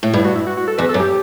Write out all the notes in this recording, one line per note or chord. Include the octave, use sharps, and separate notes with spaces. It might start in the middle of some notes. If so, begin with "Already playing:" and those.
A2
G2 E4
F#4
E4
F#4
F#4
A4
E2 B4
A4
F#2
G4